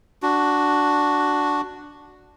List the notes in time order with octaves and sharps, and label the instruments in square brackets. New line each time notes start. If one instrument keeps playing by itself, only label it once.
[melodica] D4 F#4